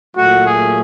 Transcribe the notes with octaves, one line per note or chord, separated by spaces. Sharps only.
A#2 F#3 A3 F#4
G#4